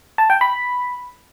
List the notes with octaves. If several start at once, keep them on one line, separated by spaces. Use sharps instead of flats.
A5
G5
B5